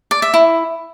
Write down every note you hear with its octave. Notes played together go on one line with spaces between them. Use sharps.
D5
E5
E4